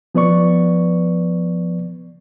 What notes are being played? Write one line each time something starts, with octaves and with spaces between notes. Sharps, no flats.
F3 B3 B4 D5 C#6